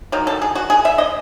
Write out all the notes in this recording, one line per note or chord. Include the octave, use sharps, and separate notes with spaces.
D#3 F#3
A4
G#4
F#4
G#4
E5
D#5